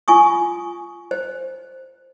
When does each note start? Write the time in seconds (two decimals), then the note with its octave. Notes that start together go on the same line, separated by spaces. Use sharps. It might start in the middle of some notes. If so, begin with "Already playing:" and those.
0.08 F4 G#5 C#6 D#6
1.11 C5